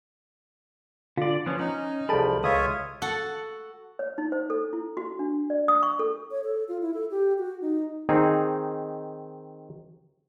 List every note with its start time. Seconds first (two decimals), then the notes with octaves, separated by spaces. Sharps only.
1.18 D3 F4 D5
1.46 F3 B3 C#4 C#5
1.59 C#4 D#4 F#5
2.09 C2 F3 G#4 A4 D5 A5 B5
2.44 C#2 F4 C#5 E5 D#6
3.02 F#4 A4 F#5
3.99 C#5
4.18 D#4
4.32 C5
4.50 A4
4.73 E4
4.97 F#4
5.19 D4
5.50 D5
5.68 D#6
5.83 C#6
5.99 A4
6.31 C#5
6.44 A4
6.68 F4
6.82 E4
6.94 A4
7.11 G4
7.38 F#4
7.62 D#4
8.09 D#3 C4 D#4 G#4